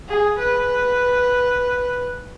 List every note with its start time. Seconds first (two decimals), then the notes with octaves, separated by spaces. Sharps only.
0.09 G#4
0.39 B4